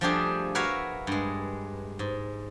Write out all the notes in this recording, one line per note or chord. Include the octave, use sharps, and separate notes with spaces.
F3 G3 A3 D4 G4 G#4
F#4 A#4 B4 C#5 E5 F5
G2 G#3
G#2